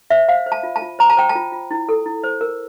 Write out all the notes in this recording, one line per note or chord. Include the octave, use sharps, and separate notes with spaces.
C5 E5
C5 F5
C5
A5
F4
A5
F4
C5 A#5
A5
C5 G5
A5
F4
F4
E4
A4
E4
C5
A#4